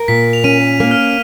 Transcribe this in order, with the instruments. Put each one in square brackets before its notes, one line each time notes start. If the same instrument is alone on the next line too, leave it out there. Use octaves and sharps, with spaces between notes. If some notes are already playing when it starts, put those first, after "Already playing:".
Already playing: [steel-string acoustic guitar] A#4
[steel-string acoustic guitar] A#2 [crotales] B6
[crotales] F7
[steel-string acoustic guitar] C#4 [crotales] D#7
[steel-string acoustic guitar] A#3
[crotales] F6